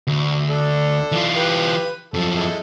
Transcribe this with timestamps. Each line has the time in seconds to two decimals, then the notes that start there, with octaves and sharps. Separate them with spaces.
0.07 D2
0.50 D4 A4
1.12 E3 F4
1.36 G4 B4
2.14 F#2 F3 A4
2.36 G#3 E4 A4